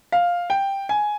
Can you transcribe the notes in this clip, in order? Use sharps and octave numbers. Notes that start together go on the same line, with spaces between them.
F5
G5
G#5